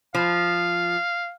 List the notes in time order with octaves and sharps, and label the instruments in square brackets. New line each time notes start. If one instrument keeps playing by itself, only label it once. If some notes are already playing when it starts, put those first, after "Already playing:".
[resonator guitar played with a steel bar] F3 [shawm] F5